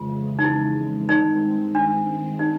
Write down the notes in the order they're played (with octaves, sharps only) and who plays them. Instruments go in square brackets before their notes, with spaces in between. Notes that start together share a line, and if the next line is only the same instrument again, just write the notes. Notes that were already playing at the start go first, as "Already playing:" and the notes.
Already playing: [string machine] F2 C#3 E3 G#3 [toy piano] F4
[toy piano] D#4
E4
[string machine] G2 D#3 G#3 C4 [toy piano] D#4
[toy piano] D4
D#4